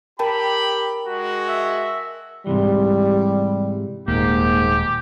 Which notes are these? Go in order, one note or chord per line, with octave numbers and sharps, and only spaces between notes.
G4 A#4 G5 A5 B5
G#3 F#4
E5
G#2 C3 E3 G3
D#1 G#2 A#3 G4